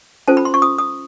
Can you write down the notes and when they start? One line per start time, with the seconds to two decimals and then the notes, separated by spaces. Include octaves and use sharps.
0.28 C#4 F4 A4 C5 A5
0.37 B5
0.45 C6
0.54 C#6
0.62 D#6
0.79 D#6